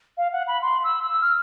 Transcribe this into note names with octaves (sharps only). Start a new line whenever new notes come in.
F5
F#5
B5
C6
E6
E6
F6